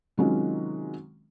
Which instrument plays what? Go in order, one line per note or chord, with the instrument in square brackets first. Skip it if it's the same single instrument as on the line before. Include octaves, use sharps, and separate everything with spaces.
[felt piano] C3 D#3 F#3 G#3 C#4 F4